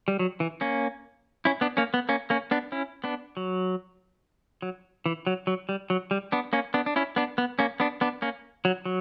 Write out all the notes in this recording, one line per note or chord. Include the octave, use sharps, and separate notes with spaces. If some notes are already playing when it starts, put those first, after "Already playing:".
G3
F#3
E3
A#3 C#4
C#4 E4
B3 D4
A#3 C#4
B3
A#3 C#4
A#3 C#4
B3 D4
C#4 E4
B3 D4
F#3
F#3
E3
F#3
F#3
G3
F#3
G3
B3 D4
A#3 C#4
B3 D4
D4
C#4 E4
B3 D4
B3
A#3 C#4
B3 D4
B3 D4
A#3 C#4
F#3
F#3